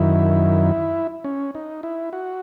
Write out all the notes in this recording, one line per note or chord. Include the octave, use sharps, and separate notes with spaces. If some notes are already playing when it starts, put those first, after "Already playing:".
Already playing: F#2 D#3 E4
C#4
D#4
E4
F#4